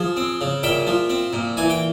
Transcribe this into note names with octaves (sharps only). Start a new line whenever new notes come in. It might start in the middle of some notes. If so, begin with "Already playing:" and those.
Already playing: F3 G#4 C5
C4
C#3
A#2 E5 G5
F3
C4
A#2
E3 G#5
G5